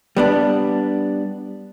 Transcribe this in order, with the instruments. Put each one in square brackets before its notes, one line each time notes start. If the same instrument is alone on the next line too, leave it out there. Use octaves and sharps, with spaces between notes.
[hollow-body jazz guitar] G3 B3 D4